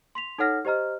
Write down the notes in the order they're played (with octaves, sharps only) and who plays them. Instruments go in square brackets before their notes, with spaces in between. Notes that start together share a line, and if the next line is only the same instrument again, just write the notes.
[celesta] C6 B6 F7
D#4 A4 C#5 F#5 F6 A#6
G4 C5 D#5 A#5 F6